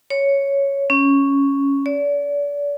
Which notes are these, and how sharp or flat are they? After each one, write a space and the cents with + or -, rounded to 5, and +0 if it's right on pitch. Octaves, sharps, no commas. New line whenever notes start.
C#5 +0
C#4 +0
D5 -35